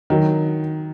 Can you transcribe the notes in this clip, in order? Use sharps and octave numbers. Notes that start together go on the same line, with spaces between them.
D#3 F#3